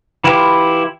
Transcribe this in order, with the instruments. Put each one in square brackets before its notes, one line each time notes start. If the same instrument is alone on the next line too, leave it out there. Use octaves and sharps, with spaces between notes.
[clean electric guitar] E3 E4 F4 G4